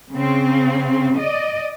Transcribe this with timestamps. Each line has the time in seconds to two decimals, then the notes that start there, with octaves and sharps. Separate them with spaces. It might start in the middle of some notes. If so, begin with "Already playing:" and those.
0.11 C#3 C4
1.18 D5 D#5